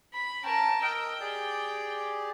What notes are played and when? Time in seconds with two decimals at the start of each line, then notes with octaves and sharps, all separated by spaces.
0.14 B5
0.44 C#4 A#4 G5 A5
0.82 A#4 D#5 G5 E6
1.21 G4 G#4 D5